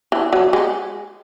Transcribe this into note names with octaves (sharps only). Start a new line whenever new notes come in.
E3
F#3
G#3